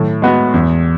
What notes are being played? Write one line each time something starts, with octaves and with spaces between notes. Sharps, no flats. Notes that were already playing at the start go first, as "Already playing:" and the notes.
Already playing: A2 D#3 F#3
G#3 B3 F#4
E2